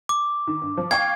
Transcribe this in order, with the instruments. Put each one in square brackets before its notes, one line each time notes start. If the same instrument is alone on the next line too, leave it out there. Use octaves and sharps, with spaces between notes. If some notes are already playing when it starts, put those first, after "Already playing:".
[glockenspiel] D6
[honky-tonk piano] D#3
G2
F3
[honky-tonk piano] F5 G5 C#6 [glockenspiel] G#6